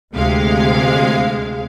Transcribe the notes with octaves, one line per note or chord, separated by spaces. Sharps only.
D2 C3 G#3 F5